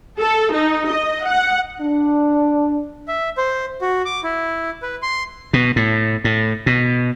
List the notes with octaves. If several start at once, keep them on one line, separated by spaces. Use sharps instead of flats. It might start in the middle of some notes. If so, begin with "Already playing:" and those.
A4
D#4
D#5
F#5
D4
E5
C5
F#4
D6
E4
B4
C6
B2
A2
A2
B2